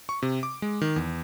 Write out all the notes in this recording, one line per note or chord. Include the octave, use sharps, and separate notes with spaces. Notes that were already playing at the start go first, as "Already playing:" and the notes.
C#6
C3
D6
G#3
D#3
E2